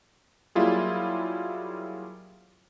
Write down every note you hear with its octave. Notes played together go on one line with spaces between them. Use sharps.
F#3 G3 A#3 E4 F4 G#4